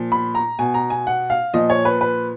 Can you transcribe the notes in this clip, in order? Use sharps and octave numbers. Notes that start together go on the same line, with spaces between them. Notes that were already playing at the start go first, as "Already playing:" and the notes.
Already playing: A#2 F3
B5
A#5
B2 G#5
A#5
G#5
F#5
F5
A#2 F3 D#5
C#5
B4
B4